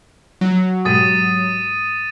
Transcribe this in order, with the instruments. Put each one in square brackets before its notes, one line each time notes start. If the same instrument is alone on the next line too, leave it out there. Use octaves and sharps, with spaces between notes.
[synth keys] F#3
[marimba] G#2 B2 G#3 [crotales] D#6 A6 D#7